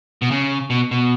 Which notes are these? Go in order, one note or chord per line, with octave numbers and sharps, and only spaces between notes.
B2
C#3
B2
B2